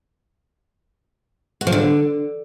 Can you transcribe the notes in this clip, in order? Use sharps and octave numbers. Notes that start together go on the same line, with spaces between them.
F#4
F3
D3